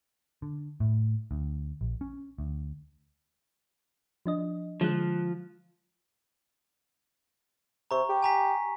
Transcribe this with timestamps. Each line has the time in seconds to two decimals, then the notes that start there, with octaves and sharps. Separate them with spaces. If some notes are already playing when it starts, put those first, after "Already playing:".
0.42 D3
0.80 A2
1.31 D2
1.81 A#1
2.01 C#4
2.38 D2
4.26 F3 D4 D#5
4.81 D3 F3 G#3 F#6
7.91 C3 A#5 C#6
8.09 G4
8.22 G#5 A#5 B6